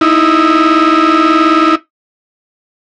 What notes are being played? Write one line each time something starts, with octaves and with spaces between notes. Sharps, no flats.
D#4 E4